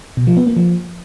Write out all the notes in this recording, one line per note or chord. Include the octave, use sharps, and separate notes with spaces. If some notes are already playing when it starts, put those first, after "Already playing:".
B2
F3
B3
A#3
F3